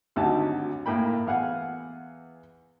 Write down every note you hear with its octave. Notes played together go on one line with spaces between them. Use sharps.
G#1 D2 F#3 D#4 G4 A5
A2 A#3 G5 B5
E2 F5 F#5 G#5